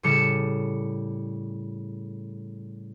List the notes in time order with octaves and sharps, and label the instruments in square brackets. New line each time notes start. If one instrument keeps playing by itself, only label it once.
[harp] A2 C#3 G3 C#7 E7